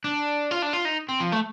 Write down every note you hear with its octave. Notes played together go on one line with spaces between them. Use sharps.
D4
F4
D4
F4
D#4
C4
F3
A3